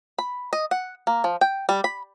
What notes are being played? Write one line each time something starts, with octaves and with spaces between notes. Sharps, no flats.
B5
D#5
F#5
A#3
F3
G5
G3
B5